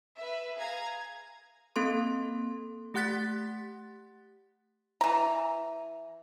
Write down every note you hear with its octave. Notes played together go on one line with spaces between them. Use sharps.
B4 E5
G#4 F5 A#5 G#6
A#3 C4 A4 C6
A3 G4 F#5 F#6 A6 B6
E3 A#5